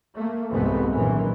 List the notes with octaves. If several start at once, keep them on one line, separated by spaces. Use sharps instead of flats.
A3 A#3
C2 F2 G#2 E3 A3 B3
A#1 F#2 D#3 E3